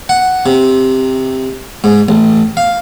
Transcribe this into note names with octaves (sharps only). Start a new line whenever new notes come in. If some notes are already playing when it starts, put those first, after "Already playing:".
F#5
C3
G#2
A1
F5